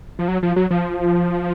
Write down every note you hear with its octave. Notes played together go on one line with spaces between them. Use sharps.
F3
F#3
F3
F#3
F3